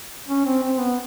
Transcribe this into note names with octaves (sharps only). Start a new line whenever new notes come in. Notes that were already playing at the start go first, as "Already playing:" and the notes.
C#4
C4
C4
B3